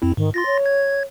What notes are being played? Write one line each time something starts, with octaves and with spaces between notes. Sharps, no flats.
F2 C4 E4
G#2 D#3
F4 C6 A6 A#6
C#5
G#6